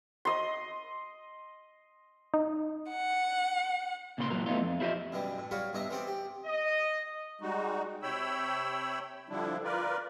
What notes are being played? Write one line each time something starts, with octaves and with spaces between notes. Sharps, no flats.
D#5 C6
D#4
F#5
A#2 C#3 A#3 B5 C6
F#2 A#2 F#3 A#4
A3 B3 D4 D#4 F4
F2
E4 F4 G4 C#5 D#5 E5
F#2 B2 E3 G3
A2
F#3 G3 F4 F#4 B4 C#5
B1 G2 D#4 E5 A#5
E3 B3 C4 G4 D5
G4
D#5
G3 G#3 D#4 F#4
C3 C#5 G5 B5 E6
D3 F3 G3 D4 E4
F4 A#4 B4 D5